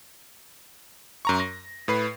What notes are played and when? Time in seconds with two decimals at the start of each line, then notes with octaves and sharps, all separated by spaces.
1.25 F#2 A#5 C#6
1.40 A#6
1.88 A2 B4 C7